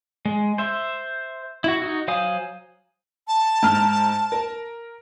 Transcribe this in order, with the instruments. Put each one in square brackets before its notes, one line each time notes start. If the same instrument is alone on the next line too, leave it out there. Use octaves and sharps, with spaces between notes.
[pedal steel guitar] G#3
C5 E5
E4 F#4
D#4 F#4
F#3 C5 F5 G#5 D#6
[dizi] A5
[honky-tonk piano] G#2 F6
A#4